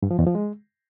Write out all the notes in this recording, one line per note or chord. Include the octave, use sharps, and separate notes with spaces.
G2
F3
E2
F3
G#3